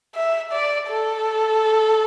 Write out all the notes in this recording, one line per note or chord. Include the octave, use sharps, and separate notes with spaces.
E5
D5
A4